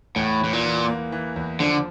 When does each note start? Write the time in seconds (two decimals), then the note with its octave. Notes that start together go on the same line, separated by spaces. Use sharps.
0.16 E2 A2
0.41 A2 E3
0.53 A#2
0.64 E3
0.88 A#3
1.12 E3
1.36 E2
1.60 D3 F3